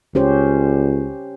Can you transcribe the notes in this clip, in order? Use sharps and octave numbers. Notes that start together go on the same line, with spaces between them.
C#2 C#4 G4 C5